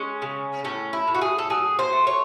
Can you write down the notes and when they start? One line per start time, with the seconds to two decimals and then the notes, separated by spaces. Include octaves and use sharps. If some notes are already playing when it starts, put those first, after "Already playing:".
Already playing: G#3 C#4
0.22 C#3
0.64 A2 C#4
0.93 E4
1.08 A2
1.15 F#4
1.21 G#4
1.38 A4
1.50 F#3 G#4
1.79 C5
1.93 A3
2.07 C#5